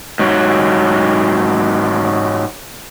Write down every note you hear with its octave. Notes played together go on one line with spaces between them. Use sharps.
G#2 F#3